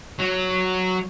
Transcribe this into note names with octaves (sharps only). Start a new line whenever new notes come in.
F#3